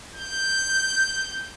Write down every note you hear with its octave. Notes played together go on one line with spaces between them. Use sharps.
G6